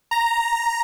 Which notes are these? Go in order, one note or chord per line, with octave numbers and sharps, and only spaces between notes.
A#5